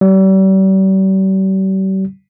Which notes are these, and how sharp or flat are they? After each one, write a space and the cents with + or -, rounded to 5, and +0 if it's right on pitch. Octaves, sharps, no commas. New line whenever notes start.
G3 -40